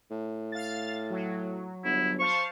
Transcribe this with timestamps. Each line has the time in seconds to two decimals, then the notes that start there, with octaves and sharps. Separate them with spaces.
0.11 A2
0.52 F5 A6
1.10 F#3
1.85 G1 E4
2.19 C5 F5 A5 C#6